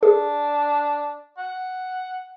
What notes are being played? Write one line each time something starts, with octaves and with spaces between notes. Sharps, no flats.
D4 G#4
F#5